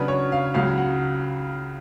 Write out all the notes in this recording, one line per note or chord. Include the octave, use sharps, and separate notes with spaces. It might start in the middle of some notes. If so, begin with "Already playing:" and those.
Already playing: C#3 F#3 B3 D4 B4
C#5
F5
C#2 C#3 F#3 F5
F#5